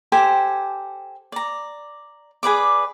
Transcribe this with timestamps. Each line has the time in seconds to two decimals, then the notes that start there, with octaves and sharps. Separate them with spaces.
0.12 G4 A4 C5 G#5
1.32 D5 A#5
2.43 G#4 B4 D5 D6